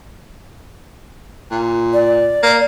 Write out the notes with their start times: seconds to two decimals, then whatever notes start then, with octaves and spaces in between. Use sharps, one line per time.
1.51 A#2
1.93 D5
2.43 A#3